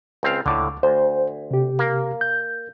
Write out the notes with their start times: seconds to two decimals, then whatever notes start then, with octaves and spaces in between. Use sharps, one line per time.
0.23 C#2 C4 F5
0.46 C#2 A2 D3 D6
0.83 D2 C5
1.51 C3 G4
1.79 A#3
2.21 G6